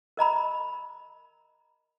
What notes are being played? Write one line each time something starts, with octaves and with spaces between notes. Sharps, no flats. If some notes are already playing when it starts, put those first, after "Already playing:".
A#4 D#5 A#5 B5